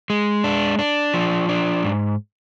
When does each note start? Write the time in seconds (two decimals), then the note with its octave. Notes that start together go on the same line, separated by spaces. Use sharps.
0.10 G#3
0.44 D4
0.79 D4
1.14 F3
1.49 D4
1.84 G#2